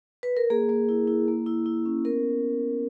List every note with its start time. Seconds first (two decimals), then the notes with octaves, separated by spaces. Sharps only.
0.23 B4
0.37 A#4
0.50 A#3 G#4
0.69 A#3
0.89 E4
1.07 E4
1.28 A#3
1.46 E4
1.66 E4
1.85 C#4
2.05 B3 A#4